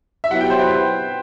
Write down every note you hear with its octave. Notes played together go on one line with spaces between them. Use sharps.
E5
F#3 B3 E4 G4 F#5
G5
C5
B4